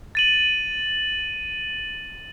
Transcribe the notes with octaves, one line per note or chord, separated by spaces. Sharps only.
A6 D#7 F#7